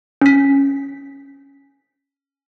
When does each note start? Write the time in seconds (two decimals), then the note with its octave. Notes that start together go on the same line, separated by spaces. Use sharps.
0.21 C#4 B6